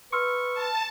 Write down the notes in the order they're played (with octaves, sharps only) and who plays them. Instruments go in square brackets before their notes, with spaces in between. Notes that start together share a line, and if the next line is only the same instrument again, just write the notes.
[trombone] B4 [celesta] C6 E6 F6 [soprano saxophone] C#6
[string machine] A5